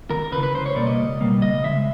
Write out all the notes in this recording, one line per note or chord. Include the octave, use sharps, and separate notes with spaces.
D#2 A#4
C#3 E3 B4
B4
C#2 C5
C#5
B2 G3 A#3 D5
D#5
C#2
B2 G3 A#3
C#2 D#5
C#3 E3 G#3 E5